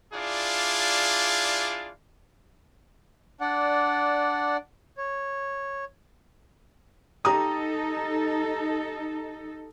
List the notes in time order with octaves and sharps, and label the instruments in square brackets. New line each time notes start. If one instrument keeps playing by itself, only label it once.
[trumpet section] D4 E4 F4 G#4 D5 F5
[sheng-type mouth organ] D4 D5 F#5
C#5
[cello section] D#4 A4 [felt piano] G4 A#5 D#6